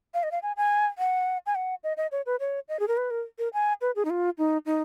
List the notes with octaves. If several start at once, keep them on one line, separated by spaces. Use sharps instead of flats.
F5
D#5
F5
G#5
G#5
F#5
G#5
F#5
D#5
D#5
C#5
B4
C#5
D#5
G#4
A#4
B4
A#4
A#4
G#5
B4
G#4
D#4
F4
D#4
D#4